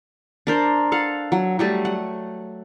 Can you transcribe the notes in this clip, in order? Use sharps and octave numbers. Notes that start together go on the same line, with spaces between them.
D4 A#4 C5
A4 F5 F#5
F#3
F#3 G3 A3
F#5